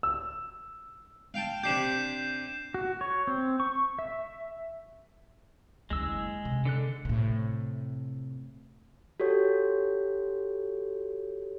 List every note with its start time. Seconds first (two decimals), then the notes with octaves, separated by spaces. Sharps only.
0.03 E6
1.34 F5 G5 A5
1.63 C3 D4 G4 G6 C7 E7
2.74 F#4
3.01 C#5
3.27 C4
3.60 C#6
3.99 E5
5.90 F#1 D#2 G#3 E6
6.45 C3 D#3
6.65 D3 A4 F#6
7.05 A2 C3
9.20 F#4 G4 A4 C#5